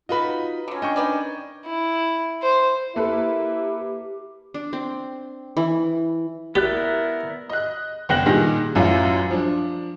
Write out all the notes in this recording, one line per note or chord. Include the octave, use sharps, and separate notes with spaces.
D#4 F4 F#4 B4 D#5 B5
D3 F#3 C#4
C#3 D4 D#5 G5 C#6
D#3 B4 D5
E4
C5
A#3 E4 G4 A4 B4
D4
C4
E3
B3 E4 G4 A#4 D5 F#6
D#5 F#6
F#1 B3 G5 F#6 A#6 F#7
A#2 D#3 G3 G4 G#4 A#6
A1 F#2 F#3 E4 F4
F3 D4